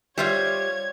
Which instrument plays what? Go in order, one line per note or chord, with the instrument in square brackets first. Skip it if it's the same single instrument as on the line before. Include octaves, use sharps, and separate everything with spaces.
[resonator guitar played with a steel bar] G3 [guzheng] F4 C5 E5 [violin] C#5 G#6